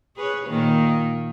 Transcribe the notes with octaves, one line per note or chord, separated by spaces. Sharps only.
G#4 B4 C#5
A#2 D#3 A#3